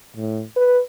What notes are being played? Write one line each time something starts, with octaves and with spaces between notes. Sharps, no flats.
A2
B4